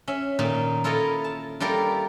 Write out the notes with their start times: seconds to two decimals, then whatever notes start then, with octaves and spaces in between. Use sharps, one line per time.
0.08 C#4 E5
0.39 A#2 D#3 A#3 D#4
0.84 E4 F4 A4 A#4 C#5 D#5
1.24 A5
1.60 G3 E4 F4 G4 A4 A#4